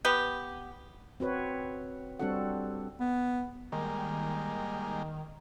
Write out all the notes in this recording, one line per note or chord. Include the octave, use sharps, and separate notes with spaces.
B3 G4
C4 F#4 B4 C#5
G3 C4 D4 F#4 A4 F#5
B3
D#3 G3 G#3 A#3